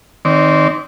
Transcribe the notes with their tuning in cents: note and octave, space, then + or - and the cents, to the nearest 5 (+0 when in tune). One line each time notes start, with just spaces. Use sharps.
D#3 +0 C4 +0 D5 -35